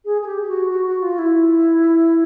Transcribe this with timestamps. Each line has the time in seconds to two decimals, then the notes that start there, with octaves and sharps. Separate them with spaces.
0.05 G#4
0.22 G#4
0.26 G4
0.42 G4
0.48 F#4
0.70 F#4
0.86 F#4
1.02 F4
1.19 E4